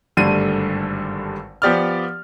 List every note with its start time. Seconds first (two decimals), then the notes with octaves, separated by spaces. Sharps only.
0.17 G#1 G2 D3 G3 A3 D#7
1.62 F3 B3 G4 D5 D#6 F6